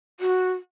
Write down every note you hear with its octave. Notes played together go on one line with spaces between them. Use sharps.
F#4